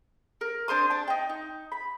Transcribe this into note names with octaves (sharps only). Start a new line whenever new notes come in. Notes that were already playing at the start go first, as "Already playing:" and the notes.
A#4
D4 C5 C6 D#6
D4 A5
D#4 G5
D#4
B5